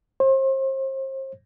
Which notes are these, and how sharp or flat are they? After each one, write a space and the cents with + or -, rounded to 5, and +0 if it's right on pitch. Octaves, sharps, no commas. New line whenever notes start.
C5 +35